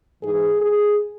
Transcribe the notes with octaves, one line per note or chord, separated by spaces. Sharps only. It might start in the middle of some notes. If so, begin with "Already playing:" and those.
G#2 E3 G#4
G#4